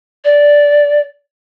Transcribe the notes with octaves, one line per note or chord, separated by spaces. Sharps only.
D5